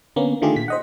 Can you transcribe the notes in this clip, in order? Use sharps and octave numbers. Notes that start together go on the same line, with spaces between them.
D3 A#3 B3 C#4
D3 D#3 A3 F4 G4 G#4
A#2 B6
C5 D#5 F#5